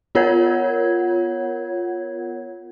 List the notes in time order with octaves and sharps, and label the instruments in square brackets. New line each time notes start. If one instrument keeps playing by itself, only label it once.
[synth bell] B3 F4 A#4 C#5 F#5 G#6